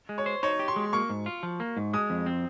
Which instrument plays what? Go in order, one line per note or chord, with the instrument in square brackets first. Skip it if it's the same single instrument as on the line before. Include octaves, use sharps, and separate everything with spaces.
[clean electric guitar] G#3
[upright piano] C#5
[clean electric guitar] C5
[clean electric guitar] D#4 [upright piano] C#5
[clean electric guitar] G4
[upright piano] C6
[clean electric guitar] G#3
[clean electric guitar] A#3 [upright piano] C#6
[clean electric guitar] G#2
F4
F3
A#3
G#2
[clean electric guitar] G#3 [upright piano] D#6
[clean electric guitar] F2
C4